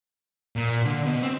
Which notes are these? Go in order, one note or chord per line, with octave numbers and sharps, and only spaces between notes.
A#2
D3
B2
C4